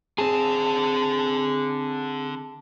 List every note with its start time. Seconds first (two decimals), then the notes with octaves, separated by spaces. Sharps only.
0.18 D3 C4 G#4 A5